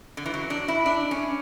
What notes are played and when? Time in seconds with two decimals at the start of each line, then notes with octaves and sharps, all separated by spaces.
0.17 D3
0.26 E3
0.34 F#3
0.50 D4
0.68 E4
0.86 D4
1.11 C#4